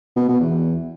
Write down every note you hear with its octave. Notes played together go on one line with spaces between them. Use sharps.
B2
B2
E2